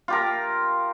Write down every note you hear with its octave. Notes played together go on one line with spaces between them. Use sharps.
F4 G4 A#4